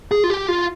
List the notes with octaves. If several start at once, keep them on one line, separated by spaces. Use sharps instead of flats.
G#4
F4
G4
F4